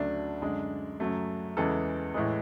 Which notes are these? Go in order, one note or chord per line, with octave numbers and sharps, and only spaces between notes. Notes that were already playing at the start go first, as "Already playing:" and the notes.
Already playing: D2 C#3 F#3 A3 D4
F#2 D3 G#3
F#2 C#3 F#3 A3
E2 C#3 E3 G#3 A4
A2 E3 G#3